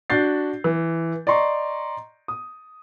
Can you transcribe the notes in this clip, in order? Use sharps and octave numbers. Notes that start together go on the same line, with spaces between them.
D4 F#4 G6 A6 C7
E3
D5 D#5 A#5 C6 C#6
D#6